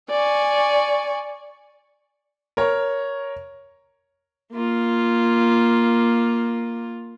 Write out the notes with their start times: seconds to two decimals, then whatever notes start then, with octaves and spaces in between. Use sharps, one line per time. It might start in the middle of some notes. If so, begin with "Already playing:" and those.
0.10 D5 G#5 C#6
2.57 A#4 C#5
4.52 A#3 F4